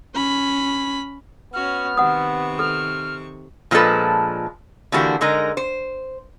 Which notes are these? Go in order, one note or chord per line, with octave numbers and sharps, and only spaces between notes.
C#4 B5
B3 C#4 F#4 F6
C3 D#3 F#5 C#6 D#6
A4 F6
A#2 F3 G#3 D4 A4 B4
D3 E3 A#3 D4 F#4 G4
D3 G#3 D#4 A#4
C5